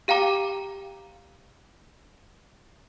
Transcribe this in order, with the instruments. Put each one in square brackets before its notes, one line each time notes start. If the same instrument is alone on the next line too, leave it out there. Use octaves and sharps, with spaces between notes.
[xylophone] G4 F5 G5 A#5 D6